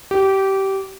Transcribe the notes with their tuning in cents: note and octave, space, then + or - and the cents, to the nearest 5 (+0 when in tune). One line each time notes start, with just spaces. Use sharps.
G4 -20